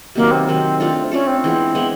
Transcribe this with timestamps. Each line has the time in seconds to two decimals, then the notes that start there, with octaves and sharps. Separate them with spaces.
0.15 C3 D#3 F#3 A#3
0.31 C4
0.47 C3 D#3 F#3
0.80 A3 D4 F4 A4
1.11 A3 C#4 D4 F4 A4
1.27 C4
1.44 E3 G#3 B3
1.75 E3 G#3 B3